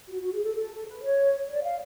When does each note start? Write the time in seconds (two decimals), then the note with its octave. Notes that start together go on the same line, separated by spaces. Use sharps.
0.09 F#4
0.21 F#4
0.33 G#4
0.44 A4
0.55 A4
0.75 A4
0.88 B4
1.02 C#5
1.49 D5
1.62 F5